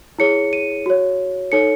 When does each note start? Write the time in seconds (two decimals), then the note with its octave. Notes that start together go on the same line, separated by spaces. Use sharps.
0.19 E4 G#4 C#5 C#7
0.53 D#7
0.86 F#4 C#5
1.52 D#4 A4 C#5 C#7